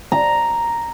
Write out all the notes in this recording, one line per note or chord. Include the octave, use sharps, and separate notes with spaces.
A#5